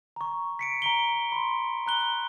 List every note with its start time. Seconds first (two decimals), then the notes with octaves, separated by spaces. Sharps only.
0.16 A#5 C#6
0.59 B6 C#7 D7
0.82 A#5 D7 G7
1.32 B5 C6
1.87 A#5 F#6 G7